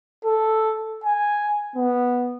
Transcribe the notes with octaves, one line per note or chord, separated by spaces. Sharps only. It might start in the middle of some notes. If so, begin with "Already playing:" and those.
A4
G#5
B3